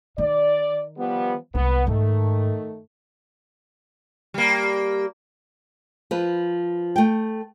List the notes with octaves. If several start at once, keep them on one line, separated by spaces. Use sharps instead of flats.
D#3 D5
F3 G3 B3
C2 G#3 B3
G#2 D#3 A3
G3 A#3
F3 B4
A3 G5